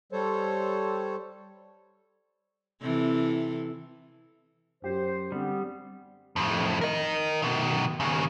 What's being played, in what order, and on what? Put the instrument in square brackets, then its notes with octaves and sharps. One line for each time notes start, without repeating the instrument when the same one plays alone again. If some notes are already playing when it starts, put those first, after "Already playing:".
[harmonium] G3 A4 C5 C#5
[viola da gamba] C3 E3 A4
[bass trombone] F#2 [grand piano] G4 [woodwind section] C5
[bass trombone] D3 [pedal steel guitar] G3 [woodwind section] B3 C4
[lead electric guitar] F2 A2
A#4 D#5
B2 D#3
D#2 C#3